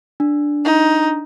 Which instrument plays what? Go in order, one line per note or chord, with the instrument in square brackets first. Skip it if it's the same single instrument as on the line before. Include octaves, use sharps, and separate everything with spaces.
[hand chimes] D4
[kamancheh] D#4